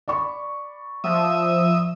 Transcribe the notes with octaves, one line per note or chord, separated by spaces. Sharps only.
D5 B5 C#6
F3 E5 D#6